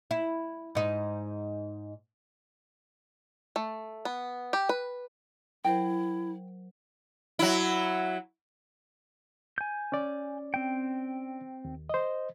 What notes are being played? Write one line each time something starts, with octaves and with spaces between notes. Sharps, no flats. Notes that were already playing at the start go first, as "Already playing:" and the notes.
E4
G#2 D#4
A3
B3
G4
B4
F#3 E4 A#4 C5 G5
F#3 E4
G#5 G6
C#4 D5
C4 G5
D#2
C5 D#5